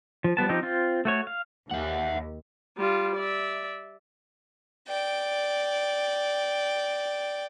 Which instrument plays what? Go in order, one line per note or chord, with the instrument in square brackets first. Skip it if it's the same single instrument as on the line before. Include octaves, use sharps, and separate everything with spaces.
[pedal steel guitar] F3
F3 G3 B3 A5
F3 C4 D#4 G4
C4 F4
A3 F#4 C#5
F5
[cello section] D#2 [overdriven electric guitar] E5 F#5
[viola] G3 F4
D5 E5
[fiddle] D5 G5